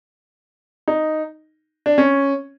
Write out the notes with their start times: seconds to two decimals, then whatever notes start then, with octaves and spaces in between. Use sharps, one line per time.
0.88 D#4
1.86 D4
1.98 C#4